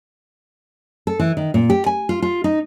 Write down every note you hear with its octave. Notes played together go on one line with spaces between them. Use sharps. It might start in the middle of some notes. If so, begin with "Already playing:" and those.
A4
E3
D#3
A#2
G4
G#5
F4
F4
D#4